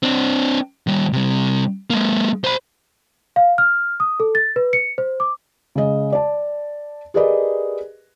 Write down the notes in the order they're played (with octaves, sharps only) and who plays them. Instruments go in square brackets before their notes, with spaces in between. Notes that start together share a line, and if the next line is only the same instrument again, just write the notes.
[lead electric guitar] C4 D4
D#3 G3
C3 G3
G#3 A#3
C5 B5
[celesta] F5
F6
D#6
A4
A6
B4
C#7
C5
D6
[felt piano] C#3 G#3 D#5
D5 A5
G4 G#4 A#4 B4 D5 D#5